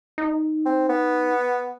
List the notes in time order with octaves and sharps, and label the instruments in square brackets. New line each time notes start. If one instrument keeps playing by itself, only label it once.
[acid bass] D#4
[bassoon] C4
B3